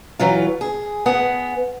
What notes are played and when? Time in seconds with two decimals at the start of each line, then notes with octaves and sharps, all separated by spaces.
0.19 E3 F#3 F4
0.61 G#4
1.06 B3 G#4 F#5